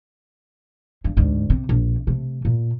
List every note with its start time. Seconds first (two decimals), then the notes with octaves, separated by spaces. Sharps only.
1.04 G2
1.17 D2 G#2
1.50 C3
1.69 A#1
2.07 C3 A3
2.45 A#2